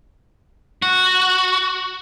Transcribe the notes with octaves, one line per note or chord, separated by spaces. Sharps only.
F#4